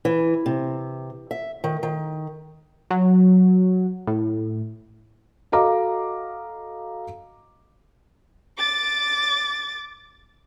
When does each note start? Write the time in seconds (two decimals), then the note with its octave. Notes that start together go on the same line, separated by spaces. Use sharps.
0.05 E3
0.46 C3
1.31 E5
1.64 D#3
1.83 D#3
2.91 F#3
4.07 A2
5.52 F#4 A4 D#5 F5 A#5 D6
8.58 D6 A6